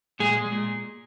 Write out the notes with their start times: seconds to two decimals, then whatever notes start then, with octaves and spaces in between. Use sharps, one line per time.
0.19 A#2 G#3 G#4
0.36 G#3
0.52 A#2